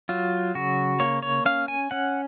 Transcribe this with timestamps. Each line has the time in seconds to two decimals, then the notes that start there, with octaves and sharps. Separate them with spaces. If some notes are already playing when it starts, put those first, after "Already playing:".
0.09 F#3 F4
0.55 C#3 F#4
1.00 A#3 C#5
1.23 C#5
1.45 C#4 F5
1.68 G#5
1.91 C#4 F#5